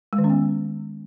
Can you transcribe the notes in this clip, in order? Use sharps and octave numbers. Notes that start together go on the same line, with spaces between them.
G#3
D#3
C#4
B3